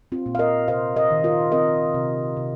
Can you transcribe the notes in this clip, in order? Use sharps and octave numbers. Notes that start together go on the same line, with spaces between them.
C4 F4
A#2
F5
A#4 D#5
C3 C5 F5
A#4 D#5
D#3
F4 A#4
C4 A#4 D#5
C3
C3